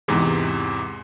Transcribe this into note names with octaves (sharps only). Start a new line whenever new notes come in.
E2 G#2 C3 E3